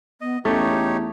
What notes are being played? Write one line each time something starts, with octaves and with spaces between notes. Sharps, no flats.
B3 D#5
E2 A3 C#4 D#4 G4 C#5